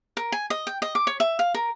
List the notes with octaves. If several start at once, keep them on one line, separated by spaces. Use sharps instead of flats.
A#4
G#5
D#5
G5
D#5
D6
C#5
E5
F5
A#4